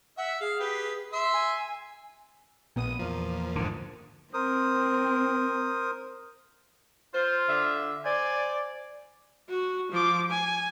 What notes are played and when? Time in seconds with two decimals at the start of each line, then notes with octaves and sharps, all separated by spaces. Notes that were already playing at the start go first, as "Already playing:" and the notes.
0.17 E5 F#5
0.41 G#4 F5
0.60 G4 B4
1.13 E5 C6 E6
1.34 G#5
2.76 A#1 A#2 B3 D#6 D#7
2.99 E2 F3 A#3
3.56 G#2 D3
4.34 C4 A#4 C5 D#6
7.14 F4 C5
7.49 D3 E5
8.05 C5 D5 G#5
9.49 F#4
9.91 F3 D6
10.30 G#5